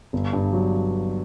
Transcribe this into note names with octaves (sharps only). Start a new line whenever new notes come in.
G1
G2
F#3